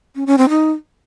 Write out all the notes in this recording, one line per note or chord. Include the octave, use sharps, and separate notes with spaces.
C#4
C#4
C4
D#4